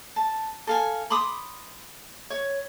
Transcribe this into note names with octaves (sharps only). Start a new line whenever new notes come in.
A5
A4 F5 G#5
B5 C6 D6 D#6
C#5